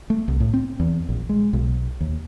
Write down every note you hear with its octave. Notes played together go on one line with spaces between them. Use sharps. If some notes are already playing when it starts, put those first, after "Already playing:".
A3
C2
A2
C4
E2
A#1
G#3
B1
D#2